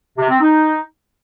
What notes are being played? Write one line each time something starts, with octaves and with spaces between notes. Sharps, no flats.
C3
C4
D#4